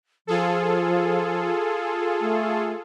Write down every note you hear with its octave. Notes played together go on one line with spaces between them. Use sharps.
F3 F4 G#4 A4
A3